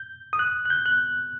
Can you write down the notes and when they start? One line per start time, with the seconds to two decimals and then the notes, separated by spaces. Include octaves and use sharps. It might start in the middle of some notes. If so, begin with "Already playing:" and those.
Already playing: G6
0.33 D#6
0.39 F#6
0.65 F#6
0.70 G6
0.86 F#6